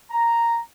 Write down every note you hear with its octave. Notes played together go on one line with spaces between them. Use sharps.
A#5